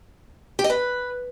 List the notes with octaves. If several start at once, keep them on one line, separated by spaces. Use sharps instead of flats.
G4
D#5
B4